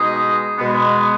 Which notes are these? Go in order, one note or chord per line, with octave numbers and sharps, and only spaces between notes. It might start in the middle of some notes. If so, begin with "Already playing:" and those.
Already playing: B2 G#3 D#4 G#4
B2 G#3 B3